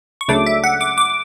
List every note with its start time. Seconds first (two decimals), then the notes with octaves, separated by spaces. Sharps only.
0.21 C#6
0.28 C#2 C#3 F#3 A3 D4 D6
0.46 E5
0.64 F#5
0.81 D6
0.98 D6